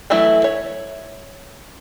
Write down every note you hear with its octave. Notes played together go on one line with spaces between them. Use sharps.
E3 F#3 A3 E4
C#5